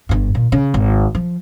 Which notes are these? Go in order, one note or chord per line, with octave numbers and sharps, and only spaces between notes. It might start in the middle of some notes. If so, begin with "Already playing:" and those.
G1 G2
A#2
C#3
G#1
F3